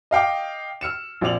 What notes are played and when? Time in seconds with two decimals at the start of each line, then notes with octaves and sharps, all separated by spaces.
0.11 D#5 F5 G5 D6
0.81 E6 F6 C#7 E7
1.21 A#1 C4 D5 F7 F#7